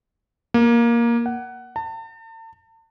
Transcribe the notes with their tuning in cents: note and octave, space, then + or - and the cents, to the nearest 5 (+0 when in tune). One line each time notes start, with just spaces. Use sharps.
A#3 +10
F#5 +15
A5 +40